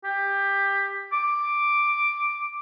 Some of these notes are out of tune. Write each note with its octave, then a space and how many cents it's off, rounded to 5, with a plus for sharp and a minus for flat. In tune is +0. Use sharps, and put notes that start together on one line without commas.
G4 +15
D6 +5